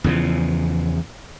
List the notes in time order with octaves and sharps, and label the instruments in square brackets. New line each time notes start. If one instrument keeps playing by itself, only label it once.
[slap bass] E2 C#3 F3